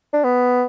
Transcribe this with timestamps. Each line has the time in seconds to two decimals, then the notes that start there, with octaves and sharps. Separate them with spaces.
0.13 D4
0.24 B3